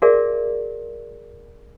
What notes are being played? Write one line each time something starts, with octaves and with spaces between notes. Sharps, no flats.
F#4 G#4 A#4 D5 E5